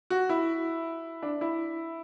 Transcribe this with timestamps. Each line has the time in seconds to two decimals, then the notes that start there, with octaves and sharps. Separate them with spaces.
0.10 F#4
0.29 E4
1.22 D4
1.41 E4